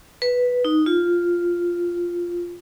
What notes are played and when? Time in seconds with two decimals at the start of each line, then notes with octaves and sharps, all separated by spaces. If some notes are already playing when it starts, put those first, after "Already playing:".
0.22 B4
0.65 D#4
0.86 F4